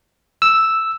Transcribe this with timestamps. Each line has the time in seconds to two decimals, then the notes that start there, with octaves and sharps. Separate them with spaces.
0.42 E6